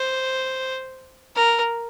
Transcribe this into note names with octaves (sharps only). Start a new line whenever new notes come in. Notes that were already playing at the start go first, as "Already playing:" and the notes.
Already playing: C5
A#4